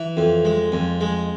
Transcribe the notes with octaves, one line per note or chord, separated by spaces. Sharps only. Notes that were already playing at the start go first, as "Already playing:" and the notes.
Already playing: E3
F2
G#3
F2
G#3